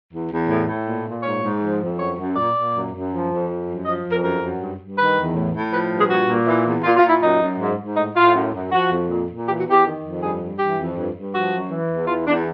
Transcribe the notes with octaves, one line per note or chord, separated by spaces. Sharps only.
E2
E2
A2
A2
A#2
A#2
G#2 C#5
G#2
F3
F2
F#2 C#5
F#2
A#2 D5
A#2
F#2
F#2
F3
F2
F3
F#2
F3 D#5
F2
A#4
F#2 A#4
F#2
G2
G2
D#3 B4
E2
A2
A2
F3 B4
G2
G#4
A#2 F#4
A#2
E3
E2
A#2 F4
F4
A#2
E4
F#2 D#4
F#2
G#2
G#2
A2 D#4
A2 F4
F#2
F#2
F3 F#4
F2
A#2
A#2
E3 G4
F#4
E2
G4
D#3
F2
G2 G#4
G2
E3 G4
F2
G2
G2
F3 F#4
F#2
E3
E2
E3 F4
E2 D4